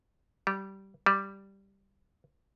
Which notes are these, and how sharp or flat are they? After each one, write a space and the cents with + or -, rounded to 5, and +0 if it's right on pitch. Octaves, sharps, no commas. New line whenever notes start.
G3 -15
G3 +0